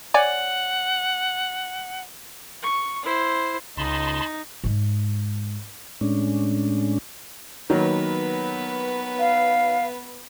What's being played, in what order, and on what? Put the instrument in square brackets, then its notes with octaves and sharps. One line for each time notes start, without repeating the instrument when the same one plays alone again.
[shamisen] C#5 D5 G#5 [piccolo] F#5
[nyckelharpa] C#6
E4 C5
[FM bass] C#2 [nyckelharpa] D#4 [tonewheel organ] A5 B5 C6
[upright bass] G#2 G#3
[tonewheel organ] A2 G#3 C#4 D4
[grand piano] D#3 F#3 A#3 [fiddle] B3 B4
[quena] F5